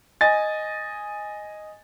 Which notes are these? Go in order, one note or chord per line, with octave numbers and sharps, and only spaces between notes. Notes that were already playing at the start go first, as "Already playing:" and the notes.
D#5 G#5 A6